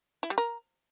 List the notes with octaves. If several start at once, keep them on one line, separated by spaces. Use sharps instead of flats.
E4
G3
A#4